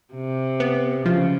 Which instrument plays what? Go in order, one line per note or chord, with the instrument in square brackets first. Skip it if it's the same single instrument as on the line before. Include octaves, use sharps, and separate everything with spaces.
[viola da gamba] C3
[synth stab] B3
[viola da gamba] C#3 [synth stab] F3